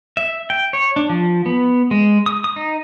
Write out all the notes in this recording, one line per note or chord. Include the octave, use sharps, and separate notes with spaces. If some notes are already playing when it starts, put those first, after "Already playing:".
E5
G5
C#5
D4
F3
B3
G#3
D#6
D#6
D#4